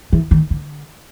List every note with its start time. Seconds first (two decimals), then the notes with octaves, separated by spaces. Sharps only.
0.13 E3
0.31 D#3
0.50 D3